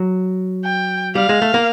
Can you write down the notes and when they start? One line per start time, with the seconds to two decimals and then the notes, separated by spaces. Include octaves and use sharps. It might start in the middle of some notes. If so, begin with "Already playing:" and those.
Already playing: F#3
0.65 G5
1.15 G3 F5
1.29 G#3
1.42 A3
1.54 A#3